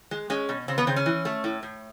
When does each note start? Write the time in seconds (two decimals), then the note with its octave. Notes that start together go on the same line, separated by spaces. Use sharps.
0.11 G#3
0.30 G#3 C#4
0.49 B2
0.68 C#3 C4
0.78 B3
0.87 C#3 C4
0.96 C#4
1.06 E3
1.25 A3
1.44 A2
1.63 A2